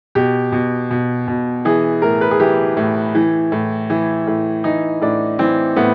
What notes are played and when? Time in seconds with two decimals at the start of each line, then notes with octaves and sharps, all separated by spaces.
0.15 B2 G4
0.52 B2
0.91 B2
1.28 B2
1.65 E3 G#4
2.02 A2 A#4
2.21 B4
2.31 G#4
2.40 E3 G4
2.77 A2
3.15 E3
3.52 A2
3.90 E3
4.27 A2
4.64 E3 D#4
5.01 A2 D4
5.39 E3 C4
5.76 A2 B3